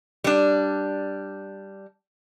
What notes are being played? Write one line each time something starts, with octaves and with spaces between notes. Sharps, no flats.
G3 D4